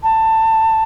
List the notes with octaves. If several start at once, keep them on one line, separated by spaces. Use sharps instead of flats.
A5